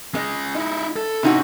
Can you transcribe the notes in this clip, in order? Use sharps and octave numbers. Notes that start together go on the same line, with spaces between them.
G#3 C#4 D#5
D#4 E4
A4
C3 C#4 D#4 E4 F#4